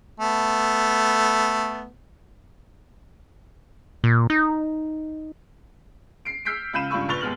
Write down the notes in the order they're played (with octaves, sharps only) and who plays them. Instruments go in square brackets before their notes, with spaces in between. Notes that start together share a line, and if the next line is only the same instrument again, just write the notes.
[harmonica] A3 B3
[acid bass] A#2
D#4
[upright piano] C7 D7
E6 F6 G6 B6 C7 D7
C#2 F5 B5 G6 D#7 E7
C#2 G2 F4 B5 C#6 E6
A#1 B4 C#6 A6 F7 G7
D#2 G#2 G#3 B3 F6 F#7